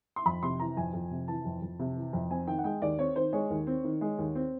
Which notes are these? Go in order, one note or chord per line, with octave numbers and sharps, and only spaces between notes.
C6
F2 B5
C3 C6
E3 A#5
F2 G#5
F2
C3
E3 A5
F2
F2
C3
E3
F2
C4 G#5
D#3 G5
F#5
G#3 G5
D#2 D5
C4 C#5
D#3 C5
G#3 C#5
D#2
C4
D#3
G#3
D#2
C4